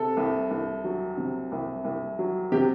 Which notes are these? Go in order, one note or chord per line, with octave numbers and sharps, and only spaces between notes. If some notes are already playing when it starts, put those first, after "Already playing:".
Already playing: C3 A4
C2
C2
F#3
C3
C2
C2
F#3
C3 G4